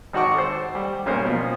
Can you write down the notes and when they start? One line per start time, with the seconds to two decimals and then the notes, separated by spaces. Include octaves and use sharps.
0.13 G#1 D#4 F#4 F#5 C#6 D6
0.35 A4 C5
0.75 G3
1.06 B1 A#2 C#4 A#4 C5
1.25 B2 F3